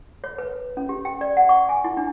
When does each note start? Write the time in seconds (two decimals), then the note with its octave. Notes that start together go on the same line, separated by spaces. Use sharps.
0.24 C#5
0.38 B4
0.77 C#4
0.89 G4
1.05 G5
1.21 D5
1.37 F#5
1.49 C#6
1.69 G#5
1.84 E4
1.97 D4